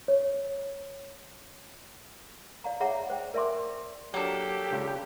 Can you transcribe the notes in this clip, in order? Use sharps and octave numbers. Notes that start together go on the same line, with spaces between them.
C#5
D5 F5 A#5
G#4 C#5 E5 F#5 A#5
C5 G5
A#4 D5 E5 G#5 C6 D6
F#3 A#3 D4 G4 A4
C#2 C#3